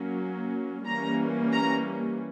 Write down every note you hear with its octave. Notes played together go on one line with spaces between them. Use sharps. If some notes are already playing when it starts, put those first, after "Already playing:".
Already playing: F#3 A#3 C#4
E3 G3 A#3 C#4 A#5
A#5